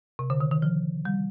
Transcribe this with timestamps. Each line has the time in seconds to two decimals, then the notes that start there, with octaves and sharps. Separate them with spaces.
0.19 C3
0.30 D3
0.40 D#3
0.51 D#3
0.62 F3
1.05 G3